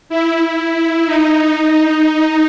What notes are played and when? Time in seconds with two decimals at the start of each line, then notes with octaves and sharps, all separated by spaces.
0.09 E4
0.41 E4
0.74 E4
1.06 D#4